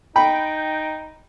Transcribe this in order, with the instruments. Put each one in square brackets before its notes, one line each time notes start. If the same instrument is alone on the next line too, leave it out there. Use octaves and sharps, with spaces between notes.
[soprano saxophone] D#4 [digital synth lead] G5 [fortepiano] B5